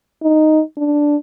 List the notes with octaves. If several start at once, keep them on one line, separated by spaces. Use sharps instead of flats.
D#4
D4